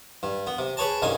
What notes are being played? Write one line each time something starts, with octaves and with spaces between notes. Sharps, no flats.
G2
B3
C3
G#4 B4 C#5 A5
C2 G2 C#3 D#4 G#5